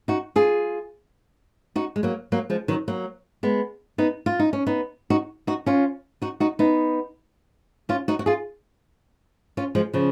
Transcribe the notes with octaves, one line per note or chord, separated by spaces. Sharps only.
D#4 F#4
F4 G#4
D#4 F#4
G#3
F#3 A#3
F#3 A#3
F3 G#3
D#3 F#3
F#3 A#3
G#3 B3
B3 D#4
F4
D#4
C#4
B3 D#4
D#4 F#4
D#4 F#4
C#4 F4
D#4 F#4
D#4 F#4
B3 D#4
C#4 F4
D#4 F#4
F#4
F4 G#4
C#4 F4
F3 G#3
C#3 F3